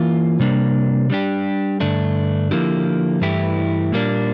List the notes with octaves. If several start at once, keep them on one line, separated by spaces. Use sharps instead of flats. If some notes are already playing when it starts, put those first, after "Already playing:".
Already playing: E3 A#3 F4
C3 G3 A#3 D4
G3 D4 G4
G2 D3 A3 D4
D3 F3 A#3 E4 G4
G2 E3 A3 E4 G4
A#2 G3 A#3 D4